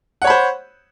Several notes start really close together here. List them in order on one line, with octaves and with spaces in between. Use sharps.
F#5 C#5 B5 C5